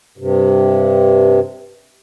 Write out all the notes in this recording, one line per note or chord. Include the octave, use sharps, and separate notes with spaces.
G2 C3